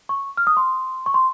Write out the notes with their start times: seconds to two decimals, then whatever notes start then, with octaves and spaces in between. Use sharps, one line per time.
0.09 C#6
0.37 F6
0.47 D#6
0.57 C6
1.06 C#6
1.14 C6